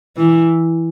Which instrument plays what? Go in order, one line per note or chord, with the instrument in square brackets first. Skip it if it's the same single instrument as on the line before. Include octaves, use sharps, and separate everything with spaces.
[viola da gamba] E3